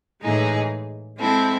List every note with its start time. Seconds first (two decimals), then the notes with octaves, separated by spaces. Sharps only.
0.21 A2 E3 G#3 D#4 G#4
1.17 G#3 C4 E4 A4